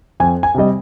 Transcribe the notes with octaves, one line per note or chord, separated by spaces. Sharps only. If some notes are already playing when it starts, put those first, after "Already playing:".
F2 G#5
G#5
C3 G3 D#5